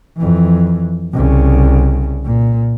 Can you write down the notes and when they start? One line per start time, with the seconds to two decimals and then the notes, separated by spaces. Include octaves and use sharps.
0.18 F2 E3
1.13 C2 C#3
2.25 A#2